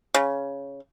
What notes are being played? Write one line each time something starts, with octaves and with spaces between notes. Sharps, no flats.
C#3